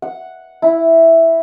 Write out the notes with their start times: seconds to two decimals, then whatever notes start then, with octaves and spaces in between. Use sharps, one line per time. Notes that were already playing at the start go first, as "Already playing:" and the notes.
0.02 F#5
0.62 E4